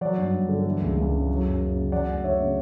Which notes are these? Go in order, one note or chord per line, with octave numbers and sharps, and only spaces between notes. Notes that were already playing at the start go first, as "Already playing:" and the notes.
F#3 D5 F#5
G2
G2
D3
E3
C#2
C#2
C#3
F#3
F#2
F#2
C#3
F#3 D5 F#5
D2
D2 C#5 E5
C#3